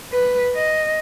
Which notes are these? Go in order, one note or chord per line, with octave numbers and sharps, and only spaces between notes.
B4
D#5